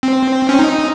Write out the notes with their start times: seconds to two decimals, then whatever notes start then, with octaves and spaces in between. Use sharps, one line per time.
0.03 C4
0.49 C#4
0.59 D#4